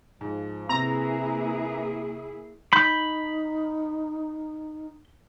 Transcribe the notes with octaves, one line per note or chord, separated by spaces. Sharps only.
G#2 F3
C3 E3 A#3 E4 G#4 A#5
D#4 B5 G6